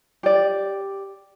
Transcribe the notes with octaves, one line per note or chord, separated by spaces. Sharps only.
G4 D5